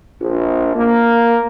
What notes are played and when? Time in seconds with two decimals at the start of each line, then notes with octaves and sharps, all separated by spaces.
0.20 A#1
0.75 A#3